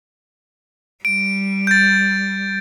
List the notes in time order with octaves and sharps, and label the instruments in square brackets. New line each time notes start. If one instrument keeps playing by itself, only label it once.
[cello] G3 [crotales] D7
[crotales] G6 A6